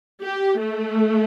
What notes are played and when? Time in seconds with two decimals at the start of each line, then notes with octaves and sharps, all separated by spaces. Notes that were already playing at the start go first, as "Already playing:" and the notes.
0.23 G4
0.60 A3